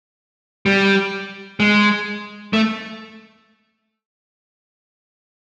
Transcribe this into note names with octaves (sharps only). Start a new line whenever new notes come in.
G3
G#3
A3